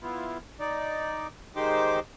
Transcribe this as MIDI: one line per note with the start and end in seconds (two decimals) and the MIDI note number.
0.01 0.38 59
0.01 0.38 64
0.01 0.38 65
0.60 1.27 63
0.60 1.27 74
1.56 2.00 51
1.56 2.00 56
1.56 2.00 63
1.56 2.00 67
1.56 2.00 72
1.56 2.00 86